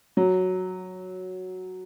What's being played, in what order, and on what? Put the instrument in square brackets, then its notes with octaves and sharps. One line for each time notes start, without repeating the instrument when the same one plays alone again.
[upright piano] F#3